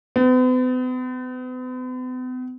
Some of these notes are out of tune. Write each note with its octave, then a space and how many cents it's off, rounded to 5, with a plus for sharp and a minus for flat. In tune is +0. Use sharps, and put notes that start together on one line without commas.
B3 +45